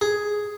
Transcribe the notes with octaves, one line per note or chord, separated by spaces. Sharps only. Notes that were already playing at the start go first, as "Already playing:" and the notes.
G#4